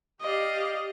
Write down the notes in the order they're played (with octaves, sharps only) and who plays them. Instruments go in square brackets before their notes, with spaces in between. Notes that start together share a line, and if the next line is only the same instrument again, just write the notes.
[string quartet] G4 D5 F5 [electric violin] D#5